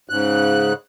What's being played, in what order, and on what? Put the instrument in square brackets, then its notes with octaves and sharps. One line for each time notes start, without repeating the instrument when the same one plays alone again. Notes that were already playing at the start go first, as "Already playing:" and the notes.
[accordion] G#2 C#3 F#6